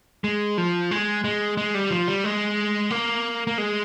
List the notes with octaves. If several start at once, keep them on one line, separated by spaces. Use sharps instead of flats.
G#3
F3
G#3
G#3
G#3
G3
F3
G3
G#3
A#3
A#3
G#3